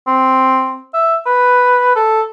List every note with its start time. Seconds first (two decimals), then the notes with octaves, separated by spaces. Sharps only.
0.07 C4
0.94 E5
1.26 B4
1.96 A4